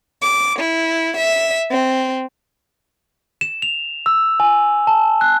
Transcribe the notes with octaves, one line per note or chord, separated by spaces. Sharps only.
D6
E4
E5
C4
E7
F7
E6
G#5
A5
F#6